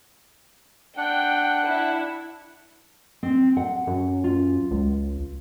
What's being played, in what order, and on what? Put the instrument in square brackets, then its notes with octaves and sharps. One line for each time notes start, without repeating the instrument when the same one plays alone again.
[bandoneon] D4 F#5 [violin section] G5
[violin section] E4
[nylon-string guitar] C4
F#5
[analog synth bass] F#2
[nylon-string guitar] F4
[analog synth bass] C#2